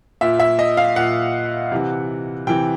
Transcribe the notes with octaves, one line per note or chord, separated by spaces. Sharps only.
A#2 E5
E5
D#5
F5
A#2 F#5
C3 E3
C3 E3 G5